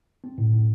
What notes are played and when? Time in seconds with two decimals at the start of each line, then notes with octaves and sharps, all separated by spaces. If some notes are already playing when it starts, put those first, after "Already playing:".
0.24 C4
0.38 A2
0.53 A2